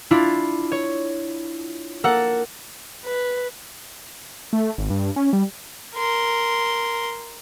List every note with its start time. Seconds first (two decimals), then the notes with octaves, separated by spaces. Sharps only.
0.11 D4 E4 F4
0.72 C#5
2.04 A#3 A4 A#4 F#5
3.05 B4
4.53 A3
4.78 G#1
4.90 G2
5.16 C#4
5.33 G3
5.95 A#4 C6